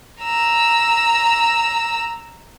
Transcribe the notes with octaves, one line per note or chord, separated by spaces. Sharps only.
A#5 E6